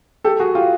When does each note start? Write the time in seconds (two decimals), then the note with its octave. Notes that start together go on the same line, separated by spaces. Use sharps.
0.24 G4 A4
0.40 F#4 G#4
0.55 F4 G4